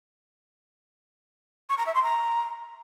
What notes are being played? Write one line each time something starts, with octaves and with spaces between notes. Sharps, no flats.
C#6
A#5
E5
C6
A#5